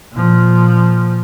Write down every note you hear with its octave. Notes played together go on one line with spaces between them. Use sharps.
A#2 F3